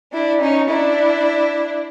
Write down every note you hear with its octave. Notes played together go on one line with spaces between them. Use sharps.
D4 E4
C#4 D#4
D4 E4